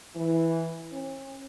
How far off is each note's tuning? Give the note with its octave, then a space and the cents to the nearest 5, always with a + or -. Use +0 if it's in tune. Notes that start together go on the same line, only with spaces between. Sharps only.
E3 -5
C#4 -45